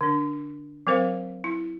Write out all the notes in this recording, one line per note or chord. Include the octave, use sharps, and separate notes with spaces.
D3 D4
F#3 C4 A#4 C5 F5
E4